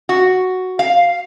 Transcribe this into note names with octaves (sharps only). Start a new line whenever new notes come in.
F#4
F5